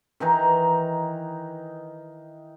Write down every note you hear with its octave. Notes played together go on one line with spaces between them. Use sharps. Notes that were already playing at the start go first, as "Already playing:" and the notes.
D#3 E3 D#4 A#5